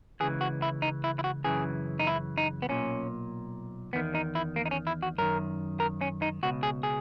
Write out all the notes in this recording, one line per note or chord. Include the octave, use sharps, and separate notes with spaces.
C#2 C#3 E3 G#4
F#4
E4
D#4
E4
E4
F#4
F#2 C#3 E3 G#4
D#4
E4
D#4
B3
B1 A#2 C#4
E2 D#3 B3
D#4
E4
A#3
D#4
C#4
E4
F#4
F#2 D#3 A#4
A#4
C#4
D#4
C#2 B2 F#4
G#4
G#4